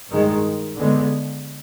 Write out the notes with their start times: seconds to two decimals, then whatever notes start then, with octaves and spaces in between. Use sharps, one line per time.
0.10 G2 D#3 G#3
0.76 D3 G#3 B3